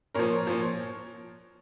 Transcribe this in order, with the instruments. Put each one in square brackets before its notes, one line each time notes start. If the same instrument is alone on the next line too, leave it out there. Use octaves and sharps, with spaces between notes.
[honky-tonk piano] A#2 F3 A#4 C#5
A#2 F3